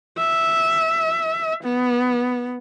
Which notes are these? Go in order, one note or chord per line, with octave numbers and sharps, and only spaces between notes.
E5
B3